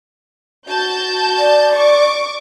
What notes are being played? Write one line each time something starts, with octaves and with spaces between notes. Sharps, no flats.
F#4 A5 G6
D5
C#6 D6